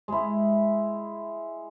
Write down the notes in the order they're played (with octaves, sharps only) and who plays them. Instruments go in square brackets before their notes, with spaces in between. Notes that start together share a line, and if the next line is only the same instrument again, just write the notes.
[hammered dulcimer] G#3 E4